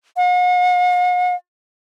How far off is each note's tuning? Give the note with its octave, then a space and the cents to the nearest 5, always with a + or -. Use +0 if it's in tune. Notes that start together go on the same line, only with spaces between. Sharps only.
F#5 -45